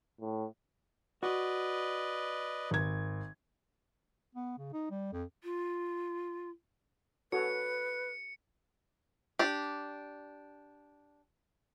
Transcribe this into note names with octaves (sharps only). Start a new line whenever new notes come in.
A2
F#4 B4 D5 D#5
G#1 G#6
B3
C#3
D#4
G3
F2
F4
F#4 A4 B4 C#5 C#7
D4 G4